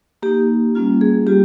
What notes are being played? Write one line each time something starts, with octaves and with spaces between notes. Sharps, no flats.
A#3 D#4 G4
G3 A#3 C#4 F4
G#4
G3 A#3 F4 G4